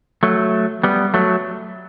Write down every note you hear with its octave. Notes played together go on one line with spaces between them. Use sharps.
F#3 A3
G3 B3
F#3 A3